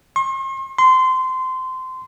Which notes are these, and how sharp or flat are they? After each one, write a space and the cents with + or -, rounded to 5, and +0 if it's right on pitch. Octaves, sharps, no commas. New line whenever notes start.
C6 +45
C6 -20